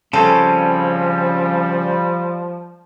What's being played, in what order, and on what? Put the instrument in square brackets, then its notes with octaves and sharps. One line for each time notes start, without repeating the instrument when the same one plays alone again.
[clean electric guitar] C#3 C4 C#4 [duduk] F3 [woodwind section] G3 [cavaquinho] A4